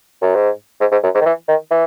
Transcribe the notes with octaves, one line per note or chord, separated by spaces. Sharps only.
F#2
G#2
G#2
G#2
F#2
G#2
D#3
E3
D#3
E3